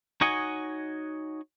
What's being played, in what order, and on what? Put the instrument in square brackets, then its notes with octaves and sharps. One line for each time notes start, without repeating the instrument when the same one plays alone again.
[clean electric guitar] D#4 F#4 C#5 D#5 F#5 G#5